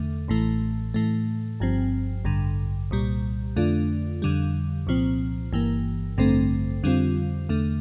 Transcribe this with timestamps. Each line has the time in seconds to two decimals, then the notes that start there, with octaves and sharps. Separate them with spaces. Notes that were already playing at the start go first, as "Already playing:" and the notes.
Already playing: E2 D3 A3
0.28 A1 A2 E3 A3
0.94 A2 E3 A3
1.60 G1 G2 F3 C4
2.25 A1 G2 D3
2.91 C2 A#2 G3
3.56 F2 D3 A3 D4 F4
4.22 F2 D3 G3
4.87 C2 A#2 F3 C4
5.53 G1 G2 E3 A#3
6.18 A1 G2 D3 A3 C4
6.83 F2 D3 G3 C4 F4
7.49 E2 D3 A3